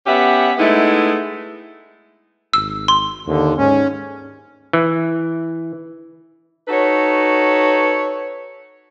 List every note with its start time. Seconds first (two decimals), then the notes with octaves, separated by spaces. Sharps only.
0.06 B3 C#4 G4 E5 F#5
0.58 G#3 A3 B3 D#4 E4
2.54 G#1 E6
2.88 C6
3.27 D#2 D3
3.58 G#2 C#4
4.73 E3
6.68 D#4 F#4 A4 B4 C#5